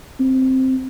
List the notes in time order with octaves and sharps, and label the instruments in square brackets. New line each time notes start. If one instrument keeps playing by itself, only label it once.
[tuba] C4